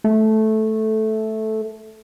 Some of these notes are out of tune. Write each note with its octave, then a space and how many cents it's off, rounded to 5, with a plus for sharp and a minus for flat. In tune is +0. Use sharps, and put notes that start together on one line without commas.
A3 -10